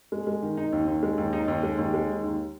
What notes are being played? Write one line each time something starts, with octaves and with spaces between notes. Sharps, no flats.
G#3
G#3
D#3
D#4
D#2
D#2
G#3
D#2
D#4
D#2
G#3
D#2
G#3
D#3
D#2